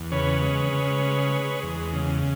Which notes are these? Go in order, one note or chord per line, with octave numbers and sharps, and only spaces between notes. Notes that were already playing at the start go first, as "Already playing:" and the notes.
Already playing: E2
C#3 B4 C#5
G#3
C#3
G#3
G#3
E2
C#3